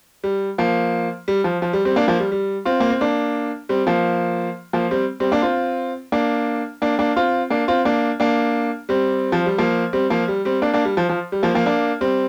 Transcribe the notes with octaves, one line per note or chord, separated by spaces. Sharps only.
G3
F3 A#3
G3
F3
F3
G3
G3 C4
A#3 D4
F3 A#3
G3
G3
C4 F4
A#3
C4
A#3 D4
G3 C4
F3 A#3
F3 A#3
G3 C4
G3 C4
A#3 D4
C4 F4
A#3 D4
A#3 D4
A#3 D4
C4 F4
A#3 D4
C4 F4
A#3 D4
A#3 D4
G3 C4
F3
G3
F3 A#3
G3 C4
F3 A#3
G3
G3 C4
A#3 D4
A#3 D4
G3
F3
F3
G3
F3 A#3
F3 A#3
A#3 D4
G3 C4